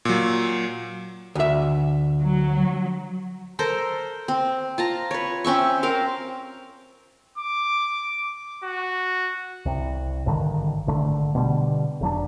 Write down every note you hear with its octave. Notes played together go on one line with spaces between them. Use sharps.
A#2 F#3
D2 E5
F#3
A4 A#4 C5
C4
F4 A5 A#5
B4 C#5
C4 C#4 E5 C#6
C4 A#4 F5
D6
F#4
C2
G#1 G2 D3 D#3
G#1 D3 A3
B2 D3 E3 G3
F1 F#3 D4